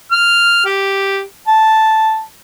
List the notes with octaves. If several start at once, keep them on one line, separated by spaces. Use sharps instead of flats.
F6
G4
A5